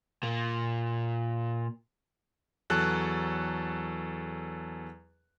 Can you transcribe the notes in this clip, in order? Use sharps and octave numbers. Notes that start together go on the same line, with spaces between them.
A#2 A#3
E2 F#3 A4 F#6